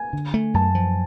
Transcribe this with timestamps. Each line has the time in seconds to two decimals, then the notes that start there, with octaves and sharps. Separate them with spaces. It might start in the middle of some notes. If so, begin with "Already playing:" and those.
Already playing: G#5
0.13 D3
0.34 A3
0.54 F#2 A5
0.75 F3